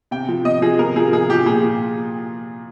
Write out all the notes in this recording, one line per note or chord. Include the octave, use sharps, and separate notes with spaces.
C3 G5
F3
C3 D#5
F3 G#4
C3 A#4
F3 G#4
C3 G#4
F3 G4
A#2 G#4